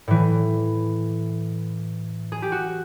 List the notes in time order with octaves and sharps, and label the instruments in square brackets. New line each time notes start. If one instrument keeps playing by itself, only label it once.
[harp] A2 E3
G#4
G4
F#4